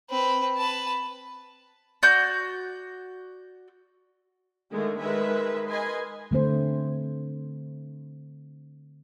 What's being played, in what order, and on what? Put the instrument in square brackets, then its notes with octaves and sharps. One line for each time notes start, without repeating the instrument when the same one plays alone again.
[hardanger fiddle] C4 B4
B4 A5
[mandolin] F#4 D5 G6
[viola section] D3 D#3 G#3 A3
D#3 G#3 B4 E5
A#4 B4 D#5 G#5 C6
[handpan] D3 A3 C4 C5